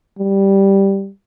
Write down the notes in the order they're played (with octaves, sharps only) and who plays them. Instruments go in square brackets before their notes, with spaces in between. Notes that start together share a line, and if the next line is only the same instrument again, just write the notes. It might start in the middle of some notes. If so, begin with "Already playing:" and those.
[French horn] G3